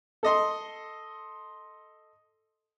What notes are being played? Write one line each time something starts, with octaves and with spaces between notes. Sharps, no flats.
A4 D#5 C6